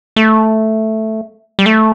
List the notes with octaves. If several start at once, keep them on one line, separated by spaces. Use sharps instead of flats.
A3
G3
A3